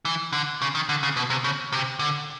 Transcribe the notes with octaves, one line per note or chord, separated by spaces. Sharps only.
E3
D3
C#3
D#3
D3
C#3
B2
C3
C#3
C3
D3